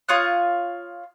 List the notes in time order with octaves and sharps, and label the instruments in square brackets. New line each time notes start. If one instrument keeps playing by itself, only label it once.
[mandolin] F4 C#5 D#6 F#6